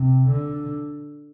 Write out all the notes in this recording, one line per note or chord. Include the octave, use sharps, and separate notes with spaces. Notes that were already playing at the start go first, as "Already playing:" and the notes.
Already playing: C3
D3